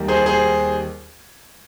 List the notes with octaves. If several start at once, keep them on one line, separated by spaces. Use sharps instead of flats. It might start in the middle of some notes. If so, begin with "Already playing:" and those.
Already playing: D#2 D#3 G3
G#4 C5
G#4 C5